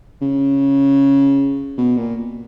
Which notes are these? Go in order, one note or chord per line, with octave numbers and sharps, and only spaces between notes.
C#3
B2
A#2